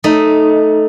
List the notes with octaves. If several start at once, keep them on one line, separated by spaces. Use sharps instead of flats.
A3 D#4